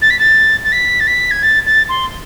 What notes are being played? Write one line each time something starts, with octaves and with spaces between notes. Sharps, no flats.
A6
B6
A6
A6
B6
A6
B6
G#6
A6
A6
C6